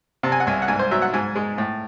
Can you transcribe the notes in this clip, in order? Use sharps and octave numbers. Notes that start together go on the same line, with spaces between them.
C3 A5
G#5
F#5
C2 G#5
F#5
G#2 G#5
C5
F#3 E5
F#5
G#2 G#5
G#3
A2